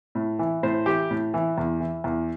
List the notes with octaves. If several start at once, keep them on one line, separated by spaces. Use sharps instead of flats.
A2
E3
A2 C5
E3 G4
A2
E3
E2
E3
E2